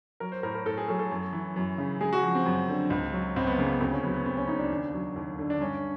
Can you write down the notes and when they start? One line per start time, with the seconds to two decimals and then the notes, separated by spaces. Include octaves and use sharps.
0.20 F#3 A#4
0.32 C5
0.43 A2 A#4
0.55 A#4
0.66 A2 A4
0.77 G#4
0.88 F#3 A4
0.99 A4
1.11 F#2
1.33 E3
1.56 F#2
1.78 C#3
2.01 G#3 G#4
2.13 F#4
2.23 F3
2.35 C4
2.46 F#2
2.68 D3
2.90 C#2
3.13 F#3
3.36 C#2 C4
3.47 B3
3.58 C#3 A#3
3.69 B3
3.80 D2 C4
3.92 C#4
4.03 F#3 B3
4.14 B3
4.25 D2 C4
4.37 C#4
4.48 C#3 D#4
4.59 D4
4.71 D#2
4.93 F#3
5.16 D#2
5.38 D3
5.50 D4
5.61 G2 C#4